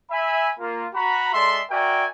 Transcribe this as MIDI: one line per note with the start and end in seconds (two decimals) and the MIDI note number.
0.10 0.50 76
0.10 0.50 80
0.10 0.50 83
0.59 0.87 58
0.59 0.87 65
0.94 1.33 66
0.94 1.33 82
0.94 1.33 83
1.33 1.60 56
1.33 1.60 69
1.33 1.60 74
1.33 1.60 76
1.33 1.60 84
1.70 2.05 66
1.70 2.05 70
1.70 2.05 74
1.70 2.05 76
1.70 2.05 79
1.70 2.05 80